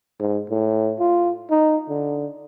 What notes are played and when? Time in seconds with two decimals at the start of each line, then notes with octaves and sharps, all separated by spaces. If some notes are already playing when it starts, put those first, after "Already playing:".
0.20 G#2
0.50 A2
0.99 F4
1.50 D#4
1.89 D3